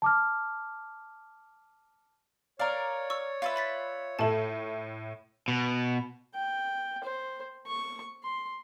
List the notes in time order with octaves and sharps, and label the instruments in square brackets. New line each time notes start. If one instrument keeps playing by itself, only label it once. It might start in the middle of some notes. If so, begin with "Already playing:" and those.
[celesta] A5 D6 F6
[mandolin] A#4 F5 [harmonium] C#5 [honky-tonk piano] D5
[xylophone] C#6 E6
[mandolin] F4 B4 E5
[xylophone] B5 A6 B6
[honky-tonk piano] A2 A3 [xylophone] A4 A5
[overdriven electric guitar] B2
[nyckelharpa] G5
C5
C#6
C6